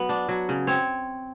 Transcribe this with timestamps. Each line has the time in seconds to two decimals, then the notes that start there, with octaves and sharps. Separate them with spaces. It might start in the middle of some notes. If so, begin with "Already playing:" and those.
Already playing: F#3 B3
0.09 D4
0.29 F#3
0.49 C#3
0.67 C4 C#5